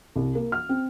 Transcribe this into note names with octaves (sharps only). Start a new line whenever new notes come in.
C2
A#3
F6
C4